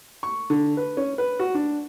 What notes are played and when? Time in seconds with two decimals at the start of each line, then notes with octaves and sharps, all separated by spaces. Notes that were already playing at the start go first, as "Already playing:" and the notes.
0.23 C#6
0.50 D3
0.77 B4
0.97 C#4
1.18 B4
1.39 F#4
1.55 D4